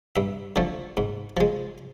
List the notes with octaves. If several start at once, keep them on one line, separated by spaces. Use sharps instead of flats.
G2 E5
D3 F3 A3
G#2
F3 G#3